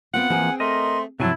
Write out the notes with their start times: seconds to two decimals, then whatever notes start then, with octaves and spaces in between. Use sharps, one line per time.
0.14 B3 C4 F4 F#5
0.30 E3 F3 A#3 C4 G#4 G#5
0.60 A3 A#4 D#5 C6
1.20 G2 C3 F3 F#3 E4 G#5 A5